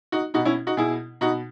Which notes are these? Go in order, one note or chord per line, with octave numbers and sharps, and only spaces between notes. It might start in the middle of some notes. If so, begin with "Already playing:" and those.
D#4 F#4
B2 D#4 F#4
C#4 E4
D#4 F#4
B2 E4 G#4
B2 D#4 F#4